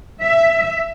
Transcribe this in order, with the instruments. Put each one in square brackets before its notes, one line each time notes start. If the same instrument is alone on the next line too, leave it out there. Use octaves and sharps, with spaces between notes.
[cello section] E5